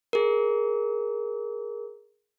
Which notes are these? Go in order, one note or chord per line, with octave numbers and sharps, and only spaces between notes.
G#4 A#4